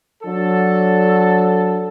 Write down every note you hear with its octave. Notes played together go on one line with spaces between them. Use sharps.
F#3 D4 A4